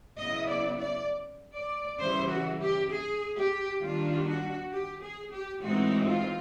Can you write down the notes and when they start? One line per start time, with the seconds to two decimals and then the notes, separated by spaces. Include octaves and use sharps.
0.18 C#3 F#3 B3 E4 D#5
0.48 D5
0.79 D5
1.54 D5
1.99 C#3 E3 G3 C5
2.29 F#4
2.60 G4
2.91 G#4
3.35 G4
3.80 D#3 G3 A#3 D4 F4
4.25 F#4
4.71 G4
5.02 G#4
5.31 G4
5.61 A2 E3 G#3 C4 D#4 F#4
6.07 F4